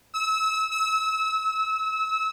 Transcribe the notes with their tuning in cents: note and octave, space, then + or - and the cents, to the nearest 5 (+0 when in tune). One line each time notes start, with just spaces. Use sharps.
E6 -25
E6 -25